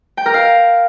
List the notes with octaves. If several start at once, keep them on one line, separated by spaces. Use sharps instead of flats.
G5
A#4
F5